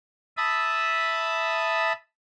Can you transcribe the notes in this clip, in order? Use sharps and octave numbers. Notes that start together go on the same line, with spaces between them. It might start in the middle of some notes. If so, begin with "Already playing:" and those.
E5 A5 B5 D#6